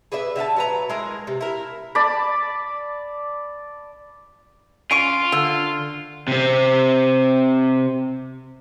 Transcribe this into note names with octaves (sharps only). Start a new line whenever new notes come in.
G#4 B4 D5 E5
D3 E5 F5 A5
F#3 B4 A#5
G#3 E4 G#4 A#4
C3
E4 A#4
D5 A5 B5
C#4 F4 C#6 D7 D#7
D3 E5
C3 C4